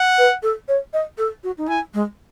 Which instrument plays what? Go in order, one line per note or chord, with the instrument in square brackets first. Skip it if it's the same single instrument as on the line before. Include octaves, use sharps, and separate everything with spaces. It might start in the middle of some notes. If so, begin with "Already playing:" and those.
Already playing: [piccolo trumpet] F#5
[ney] B4
A4
C#5
D#5
A4
F#4
D#4
[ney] E4 [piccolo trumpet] G#5
[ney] G#3